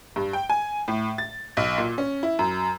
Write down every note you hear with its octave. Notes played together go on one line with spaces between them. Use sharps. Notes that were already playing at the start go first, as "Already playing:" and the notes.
G2
G5
G#5
A2
A6
B1
A#2
C#4
E4
F#2